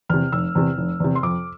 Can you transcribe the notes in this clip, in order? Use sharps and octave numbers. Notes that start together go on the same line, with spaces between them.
E2 C3 F6
F1 E6
E2 C3
F1
E2 C3
C6
F2 D6